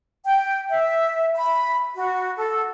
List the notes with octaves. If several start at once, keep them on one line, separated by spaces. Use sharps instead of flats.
G5
E5
B5
F#4
A4